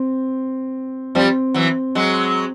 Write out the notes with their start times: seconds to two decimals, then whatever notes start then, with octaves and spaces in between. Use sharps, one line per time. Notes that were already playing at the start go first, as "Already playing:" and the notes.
Already playing: C4
1.15 F3 G3 C4
1.54 E3 F#3
1.95 F#3 G#3